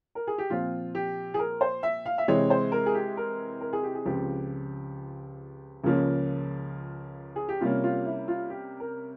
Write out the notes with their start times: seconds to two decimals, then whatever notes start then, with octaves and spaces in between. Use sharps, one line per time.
0.15 A#4
0.27 G#4
0.38 G4
0.50 A#2 F3 C4 F4
0.95 G4
1.34 G#4
1.39 A#4
1.61 C5
1.83 E5
2.06 F5
2.18 E5
2.28 C3 E3 G#3 C4 C#5
2.50 C5
2.72 A#4
2.86 G#4
2.94 G4
3.17 A#4
3.61 A#4
3.73 G#4
3.83 G4
3.94 G#4
4.05 C#2 C#3 F3 C4 G4
5.84 C#2 C#3 F3 A#3 C#4
7.36 G#4
7.48 G4
7.61 C3 G3 A#3 C#4 F4
7.84 F4
8.06 E4
8.28 F4
8.50 G4
8.80 A#4